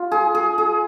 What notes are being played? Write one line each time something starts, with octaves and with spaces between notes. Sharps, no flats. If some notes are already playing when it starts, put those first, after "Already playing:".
Already playing: F4
G#4
G#4
G#4